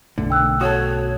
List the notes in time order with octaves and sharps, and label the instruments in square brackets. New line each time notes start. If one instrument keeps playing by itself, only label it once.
[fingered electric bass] B1 F#2 A3 [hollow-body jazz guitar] D3
[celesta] G5 E6 F#6
[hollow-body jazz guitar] F#4 A4 [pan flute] C#5 [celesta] D#6